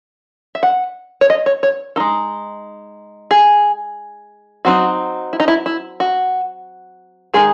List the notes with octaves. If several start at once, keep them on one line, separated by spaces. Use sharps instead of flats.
E5
F#5
C#5
D#5
C#5
C#5
G#3 D#4 A4
G#4
F#3 C4 D#4 F#4
E4
D#4
E4
E4
F#4
D#3 G#3 D#4 G#4